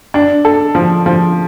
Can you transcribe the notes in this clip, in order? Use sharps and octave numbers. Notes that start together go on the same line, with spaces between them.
D4
A4
F3
F3